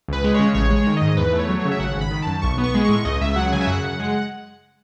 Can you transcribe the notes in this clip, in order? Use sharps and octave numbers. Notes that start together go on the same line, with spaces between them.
C#2 B4
G#3
C#3 C#5
A1 C#5
G#3
C#5
D#3
G#2 D#5
E2 B4
A3
C#5
F#3
C#5
C#3
E5
G#1 F#5
G#1 B5
D#3
F#2 A5
B1 C#6
B3
C#6
G#3
A2 C#6
C#2 D#5
C#2 E5
F#3 F#5
C#3 G#5
E5
F#2 F#5
F#2
G#3